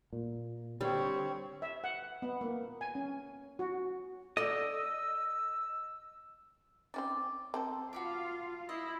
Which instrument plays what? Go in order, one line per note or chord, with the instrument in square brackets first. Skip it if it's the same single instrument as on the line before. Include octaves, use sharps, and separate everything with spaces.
[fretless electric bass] A#2
[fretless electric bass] D3 [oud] G3 [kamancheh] C4 C#5
[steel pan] E5
F#5
B3
A#3
G#5
C#4
F#4
[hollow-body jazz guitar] A4 D5 [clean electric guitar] D#5 [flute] E6
[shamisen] C4 C#4 D#4 [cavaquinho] D5
[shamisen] C4 A#4 C5 [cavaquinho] A4
[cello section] F4 F5 [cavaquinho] F#4 B5 D6
[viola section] E4 [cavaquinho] D#5